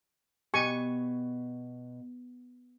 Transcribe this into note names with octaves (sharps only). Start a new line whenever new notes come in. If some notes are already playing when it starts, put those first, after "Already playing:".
B2 G4 G#5 C#6